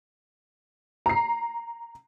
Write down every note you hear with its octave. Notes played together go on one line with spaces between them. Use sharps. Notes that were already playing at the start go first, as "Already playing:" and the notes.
A#5 C7